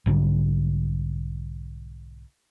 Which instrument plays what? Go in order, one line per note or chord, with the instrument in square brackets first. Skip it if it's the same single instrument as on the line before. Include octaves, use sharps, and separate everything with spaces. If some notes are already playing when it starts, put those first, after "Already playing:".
[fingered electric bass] B1 G#2 D3 G3